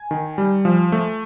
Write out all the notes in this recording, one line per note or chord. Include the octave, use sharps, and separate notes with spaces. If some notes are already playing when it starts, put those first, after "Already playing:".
Already playing: G#5
D#3
G3
F3
A3